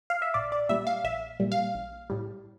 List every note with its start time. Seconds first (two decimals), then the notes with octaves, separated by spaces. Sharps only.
0.10 F5
0.22 E5
0.34 A#1 D5
0.52 D5
0.69 A#2 G3 E5
0.87 F5
1.04 A#1 E5
1.40 A#2 G3
1.52 F5
1.75 A#1
2.10 A2 G3